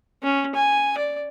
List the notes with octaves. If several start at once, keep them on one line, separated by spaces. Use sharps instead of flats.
C#4
G#5
D5